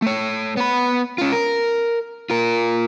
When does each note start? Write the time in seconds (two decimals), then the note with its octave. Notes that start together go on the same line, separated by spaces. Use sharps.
0.02 A3 C#5
0.57 B3 B5
1.18 C#4 F4
1.32 A#4
2.30 F4 A#4